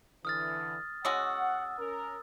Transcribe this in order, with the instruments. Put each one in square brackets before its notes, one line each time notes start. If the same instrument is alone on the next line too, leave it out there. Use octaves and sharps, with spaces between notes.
[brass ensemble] D3 E3 [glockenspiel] D#6 F6 A6
[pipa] G#3 C#4 F#4 [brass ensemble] F#5 [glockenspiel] D#6 E6
[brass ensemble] C#4 A#4